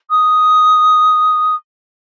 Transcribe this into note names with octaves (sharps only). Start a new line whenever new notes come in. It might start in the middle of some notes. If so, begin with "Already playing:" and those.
D#6